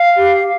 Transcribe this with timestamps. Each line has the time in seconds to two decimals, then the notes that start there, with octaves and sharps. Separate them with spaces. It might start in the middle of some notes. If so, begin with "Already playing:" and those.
Already playing: F5
0.17 G4